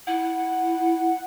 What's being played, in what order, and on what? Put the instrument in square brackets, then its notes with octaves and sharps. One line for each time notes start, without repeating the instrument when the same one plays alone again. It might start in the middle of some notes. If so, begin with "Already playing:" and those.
[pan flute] E4 [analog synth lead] F#5